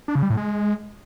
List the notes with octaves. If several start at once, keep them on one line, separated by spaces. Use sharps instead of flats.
D4
C#3
G3
A2
G#3